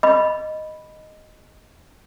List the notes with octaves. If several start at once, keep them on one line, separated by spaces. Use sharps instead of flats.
D#5 B5